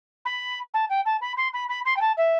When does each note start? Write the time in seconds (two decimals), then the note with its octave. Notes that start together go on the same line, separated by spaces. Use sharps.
0.25 B5
0.73 A5
0.89 G5
1.05 A5
1.21 B5
1.36 C6
1.53 B5
1.68 B5
1.85 C6
1.96 G5
2.00 A5
2.17 E5